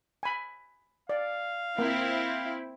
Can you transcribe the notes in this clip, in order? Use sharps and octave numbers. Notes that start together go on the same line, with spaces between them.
G#5 B5
D5 F5
A#3 C4 E4